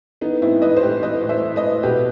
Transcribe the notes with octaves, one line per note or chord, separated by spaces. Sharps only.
E3 B3 D#4
A2 C4 E4
E3 B4 D#5
C5
A2 G4 B4
E3 B4 D#5
A2
C5 E5
E3
B4 D#5
A2
B2 G4 B4